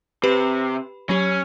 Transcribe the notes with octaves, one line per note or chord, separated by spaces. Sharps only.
C3 G4 B4 B5
F#3 C#4 G4